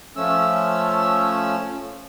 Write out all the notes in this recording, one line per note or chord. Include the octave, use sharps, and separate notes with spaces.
F3 A3 C#4 E6